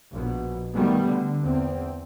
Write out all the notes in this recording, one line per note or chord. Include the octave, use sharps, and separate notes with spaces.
A#1 B2
B2 D#3 G3 A3 B3
D3
E2 C4